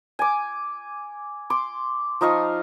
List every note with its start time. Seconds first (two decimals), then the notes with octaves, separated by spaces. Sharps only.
0.19 G#5 D6
1.50 C6 D6
2.21 F3 D#4 F5 C#6